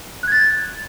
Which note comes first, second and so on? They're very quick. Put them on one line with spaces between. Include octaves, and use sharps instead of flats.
F#6 G#6 A6